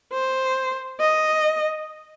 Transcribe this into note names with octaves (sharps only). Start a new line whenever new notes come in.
C5
D#5